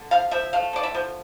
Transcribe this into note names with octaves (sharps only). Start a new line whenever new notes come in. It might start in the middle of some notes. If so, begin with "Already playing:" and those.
Already playing: D3
F3 F5
F3 E5
A3 F5
D3 D5
E5
F3